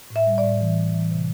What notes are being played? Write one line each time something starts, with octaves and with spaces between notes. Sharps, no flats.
A2
E5
G3
D5
A2
E3
E3
E3
C3